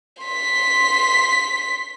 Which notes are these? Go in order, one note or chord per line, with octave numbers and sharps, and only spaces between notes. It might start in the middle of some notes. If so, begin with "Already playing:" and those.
C6 B6